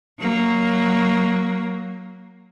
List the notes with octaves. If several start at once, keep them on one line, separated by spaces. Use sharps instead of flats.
F#3 A#3